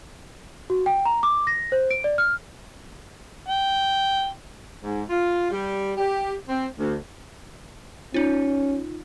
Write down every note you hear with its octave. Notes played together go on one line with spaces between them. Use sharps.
F#4
G5
A#5
D6
A#6
C5
D7
D5
F6
G5
G#2
F4
G3
G4
C4
D2
C#4 D#4 F4